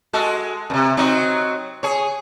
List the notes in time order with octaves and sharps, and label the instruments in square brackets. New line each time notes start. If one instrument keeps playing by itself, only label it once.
[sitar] G#3 F#4 A4
F#2 C3
F#3 C4 D#4
G#4 C#5